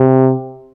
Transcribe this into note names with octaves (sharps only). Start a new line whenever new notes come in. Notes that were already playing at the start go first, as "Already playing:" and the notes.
Already playing: C3